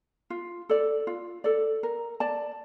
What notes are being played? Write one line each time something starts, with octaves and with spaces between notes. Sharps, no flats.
F4
A4 D5
F4
A4 D5
A#4
D5 A5